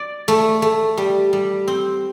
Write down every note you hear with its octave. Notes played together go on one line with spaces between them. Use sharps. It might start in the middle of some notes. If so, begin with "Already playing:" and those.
Already playing: D5
A3
A3
G3
G3
C4